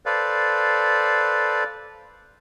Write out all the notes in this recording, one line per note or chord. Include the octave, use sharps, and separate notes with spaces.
A4 B4 C5 D5 F5